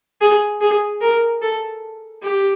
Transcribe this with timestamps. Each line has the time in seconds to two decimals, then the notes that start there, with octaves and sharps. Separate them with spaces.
0.21 G#4
0.61 G#4
1.01 A#4
1.42 A4
2.22 G4